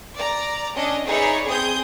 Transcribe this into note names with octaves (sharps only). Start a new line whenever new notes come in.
D5 A#5
C#4 D4 D#5
D#4 G#4 B4 C#5 D5 E5
C4 G#4 D#6 G6